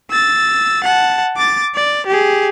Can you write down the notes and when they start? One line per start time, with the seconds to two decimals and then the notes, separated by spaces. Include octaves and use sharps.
0.10 E6 A6
0.84 F#5 A5
1.37 D6 A6
1.75 D5
2.07 G4 G#4